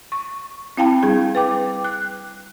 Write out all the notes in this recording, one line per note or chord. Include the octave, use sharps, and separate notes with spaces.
C#6
C4 E4 F5 G5 A5 B5
G3 D4 G#4
B4 G5 D6
F#6